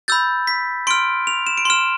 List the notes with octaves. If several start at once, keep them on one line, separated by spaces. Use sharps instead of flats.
B5 E6 G6 A6
B6
C6 F6 D7
F7
E7
D7
C6 F6 E7